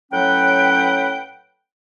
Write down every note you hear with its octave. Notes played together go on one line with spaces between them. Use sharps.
A2 F#3 C#4 B4 F#5 G5